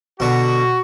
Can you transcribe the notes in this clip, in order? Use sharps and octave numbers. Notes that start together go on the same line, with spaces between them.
B2 D3 F#4